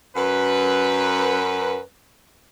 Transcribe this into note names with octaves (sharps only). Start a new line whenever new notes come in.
F#2 B4